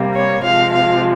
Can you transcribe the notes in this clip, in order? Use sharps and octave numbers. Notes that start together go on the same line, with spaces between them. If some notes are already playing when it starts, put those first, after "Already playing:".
Already playing: C3 G3 A#3
C#5
C3 F3 G#3 F5
F5